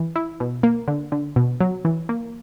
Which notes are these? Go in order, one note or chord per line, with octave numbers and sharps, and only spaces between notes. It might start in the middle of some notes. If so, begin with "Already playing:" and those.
Already playing: E3
E4
B2
A#3
D3
D3
B2
F#3
E3
A#3